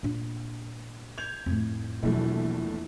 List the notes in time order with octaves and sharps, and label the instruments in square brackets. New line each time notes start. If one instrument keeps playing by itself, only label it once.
[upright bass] A#2 D4
[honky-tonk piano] G6 G#6 F7
[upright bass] F2 A2
[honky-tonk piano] A#1 E2 A3 [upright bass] B2 F#3